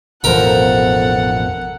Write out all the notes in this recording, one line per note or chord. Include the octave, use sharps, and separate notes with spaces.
A1 F2 B2 A4 A#4 C5 F#5 B5